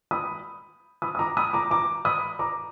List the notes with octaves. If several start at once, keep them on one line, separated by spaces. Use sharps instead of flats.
B5 D#6
B5 D#6
D#6
A#5 D6
B5 D#6
A#5 D6
A#5 D6
B5 D#6
A#5 D6